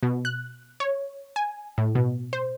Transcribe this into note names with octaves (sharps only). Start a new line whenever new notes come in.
B2
F#6
C#5
G#5
A2
B2
C5